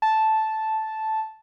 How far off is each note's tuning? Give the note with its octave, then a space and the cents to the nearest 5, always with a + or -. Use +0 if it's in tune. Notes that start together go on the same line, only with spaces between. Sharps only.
A5 -5